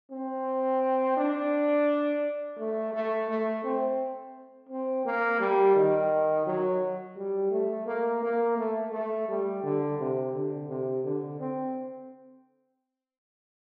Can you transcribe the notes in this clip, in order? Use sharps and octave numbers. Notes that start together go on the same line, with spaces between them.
C4
D4
A3
A3
A3
C4
C4
A#3
G3
D#3
F#3
G3
A3
A#3
A#3
A3
A3
G3
D3
C3
D3
C3
D3
C4